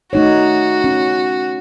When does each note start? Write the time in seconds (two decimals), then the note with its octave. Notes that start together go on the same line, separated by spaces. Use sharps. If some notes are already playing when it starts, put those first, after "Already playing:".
0.13 A3 D#4 F#4 C#5
0.84 C#4